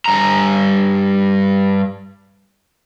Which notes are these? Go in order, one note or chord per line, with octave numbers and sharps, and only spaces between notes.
G2 A#5